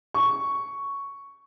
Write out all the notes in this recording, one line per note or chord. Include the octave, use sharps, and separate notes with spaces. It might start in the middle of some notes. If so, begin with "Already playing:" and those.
C#6